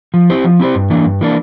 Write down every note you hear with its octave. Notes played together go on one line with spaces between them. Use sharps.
F3
C4 E4 G4 C5
F3
C4 E4 G4 C5
G2
E3 A#3 D4
G2
E3 A#3 D4